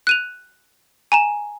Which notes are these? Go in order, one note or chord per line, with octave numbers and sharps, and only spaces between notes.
F#6 D#7 F7
G#5 A#5 E7